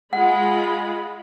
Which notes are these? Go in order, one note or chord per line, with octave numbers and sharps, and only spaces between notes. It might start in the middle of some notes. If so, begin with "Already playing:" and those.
G#3 F4 F#5 B5